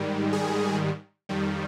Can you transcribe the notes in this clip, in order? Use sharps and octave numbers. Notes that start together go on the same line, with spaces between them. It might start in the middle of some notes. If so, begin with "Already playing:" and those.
Already playing: G#2 D#3 G3
G#4
F2 D#3 G3